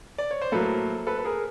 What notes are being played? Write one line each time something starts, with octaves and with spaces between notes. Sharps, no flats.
D5
C#5
C5
A2 F#3 A#3 A4 B4
A4 B4
B4
G#4 A#4